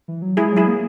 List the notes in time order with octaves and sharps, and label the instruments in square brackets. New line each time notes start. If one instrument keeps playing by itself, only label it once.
[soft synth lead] E3
F#3
[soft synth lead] G#3 [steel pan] E4 G#4
[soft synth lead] F#3 [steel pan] E4 G#4
[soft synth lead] A#3